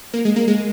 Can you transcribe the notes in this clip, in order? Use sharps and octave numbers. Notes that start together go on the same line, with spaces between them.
A#3
G#3
A#3
G#3